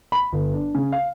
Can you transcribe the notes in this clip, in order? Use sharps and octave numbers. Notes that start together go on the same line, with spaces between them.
B5
G1
D4
C#3
F5